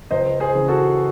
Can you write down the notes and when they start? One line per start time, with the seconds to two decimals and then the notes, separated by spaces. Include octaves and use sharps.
0.11 C#2 C5 D#5
0.40 G#4 C5
0.55 C#3 E3
0.68 F#4 A4